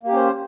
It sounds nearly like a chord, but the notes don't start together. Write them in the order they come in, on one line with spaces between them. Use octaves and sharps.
A#3 G4 C#4 C5